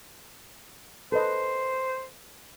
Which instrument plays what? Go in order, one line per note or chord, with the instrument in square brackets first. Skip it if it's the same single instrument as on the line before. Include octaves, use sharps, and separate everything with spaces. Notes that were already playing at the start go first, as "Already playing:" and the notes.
[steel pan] A4 B4 D#5 [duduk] C5